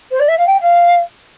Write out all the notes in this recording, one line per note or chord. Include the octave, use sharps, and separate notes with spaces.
C5
D5
E5
F5
G5
F5